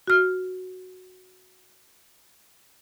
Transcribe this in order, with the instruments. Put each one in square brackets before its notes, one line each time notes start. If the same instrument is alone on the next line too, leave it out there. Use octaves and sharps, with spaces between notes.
[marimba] F#4 F6